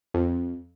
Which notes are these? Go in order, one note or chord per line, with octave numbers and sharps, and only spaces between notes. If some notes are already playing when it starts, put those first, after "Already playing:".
F2